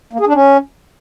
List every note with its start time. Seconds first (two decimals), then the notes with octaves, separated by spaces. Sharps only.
0.13 A#3
0.20 G#4
0.27 D4
0.34 C#4